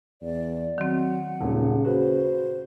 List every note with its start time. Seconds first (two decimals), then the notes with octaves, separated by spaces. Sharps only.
0.22 E2 D5
0.78 D#3 F#3 C4 F#5
1.41 D#1 A#2 C#3
1.85 F#4 B4 C5